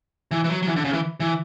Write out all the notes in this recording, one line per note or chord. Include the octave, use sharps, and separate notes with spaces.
E3
E3
F#3
F#3
E3
D3
C#3
E3
E3